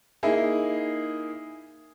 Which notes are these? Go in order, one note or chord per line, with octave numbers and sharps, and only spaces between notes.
A#3 D#4 E4 G#4